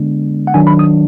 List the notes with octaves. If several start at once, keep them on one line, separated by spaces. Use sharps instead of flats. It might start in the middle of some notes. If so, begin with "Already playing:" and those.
Already playing: D3 G#3 B3 D4
F#5
D#3 F#3 D4 G#5
B5
D#6